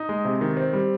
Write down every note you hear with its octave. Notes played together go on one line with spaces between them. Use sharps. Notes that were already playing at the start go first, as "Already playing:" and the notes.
Already playing: D#4
G#3
C3
D#3
C4
G3